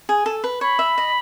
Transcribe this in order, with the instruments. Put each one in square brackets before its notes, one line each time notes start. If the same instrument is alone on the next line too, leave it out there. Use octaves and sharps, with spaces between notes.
[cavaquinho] G#4
[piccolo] G#5
[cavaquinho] A4
B4
[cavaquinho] C#5 [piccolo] B5
[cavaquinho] E5
D#5